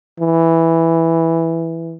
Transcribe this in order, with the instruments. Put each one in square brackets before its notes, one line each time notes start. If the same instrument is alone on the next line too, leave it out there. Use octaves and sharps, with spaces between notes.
[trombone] E3